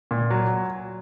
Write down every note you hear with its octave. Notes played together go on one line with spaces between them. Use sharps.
A#2
F#3